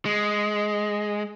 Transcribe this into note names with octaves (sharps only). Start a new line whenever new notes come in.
G#3